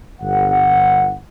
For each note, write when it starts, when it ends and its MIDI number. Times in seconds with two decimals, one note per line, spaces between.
0.21 1.15 31
0.21 1.15 78